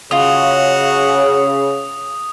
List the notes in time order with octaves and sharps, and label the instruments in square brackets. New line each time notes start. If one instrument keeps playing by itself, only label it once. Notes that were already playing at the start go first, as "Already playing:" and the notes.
[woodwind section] C#3 [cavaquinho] F4 D#5 [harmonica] F#4 [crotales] D#6